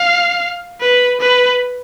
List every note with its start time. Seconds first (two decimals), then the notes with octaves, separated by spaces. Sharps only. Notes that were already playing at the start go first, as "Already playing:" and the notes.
Already playing: F5
0.81 B4
1.21 B4